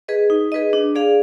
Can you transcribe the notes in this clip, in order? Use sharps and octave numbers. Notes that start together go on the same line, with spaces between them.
G#4 B4 D#5
D#4
G#4 B4 D#5
D4
G#4 D5 F5